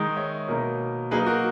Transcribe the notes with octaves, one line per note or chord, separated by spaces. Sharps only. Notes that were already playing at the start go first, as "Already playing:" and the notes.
Already playing: D#3 G#3 D#4
C#5 E5
B2 A#3 D#4 A#4 C#5
F#3 A#3 D#4 G#4 B4
F#4 A#4